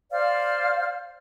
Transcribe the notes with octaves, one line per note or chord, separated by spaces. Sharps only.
C5 D5 F5 F6